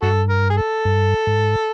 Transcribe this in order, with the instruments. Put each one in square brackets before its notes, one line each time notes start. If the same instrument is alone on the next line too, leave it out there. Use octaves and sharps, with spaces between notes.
[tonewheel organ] G2 [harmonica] F#4 A4
[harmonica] A#4
G#4
A4
[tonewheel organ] G2
G#2